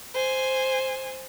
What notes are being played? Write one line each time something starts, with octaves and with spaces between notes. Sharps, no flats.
C5 G#5